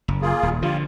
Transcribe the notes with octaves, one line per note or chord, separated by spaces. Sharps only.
F#1
A#3 F4 G#4
D#1
D3 F3 G3 F4